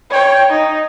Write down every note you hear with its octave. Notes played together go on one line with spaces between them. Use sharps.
C#5 G5
D#4